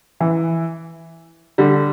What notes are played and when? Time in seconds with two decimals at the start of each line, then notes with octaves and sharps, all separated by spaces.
0.21 E3
1.58 D3 G3